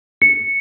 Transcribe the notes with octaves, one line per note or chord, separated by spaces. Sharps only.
C#7